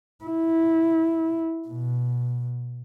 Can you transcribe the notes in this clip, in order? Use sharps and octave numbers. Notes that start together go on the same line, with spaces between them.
E4
B2